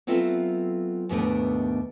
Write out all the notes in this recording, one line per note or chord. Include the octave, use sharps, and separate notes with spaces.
F#3 B3 C4 F4 A4 E5
D#2 G#2 B2 A3 B3 D4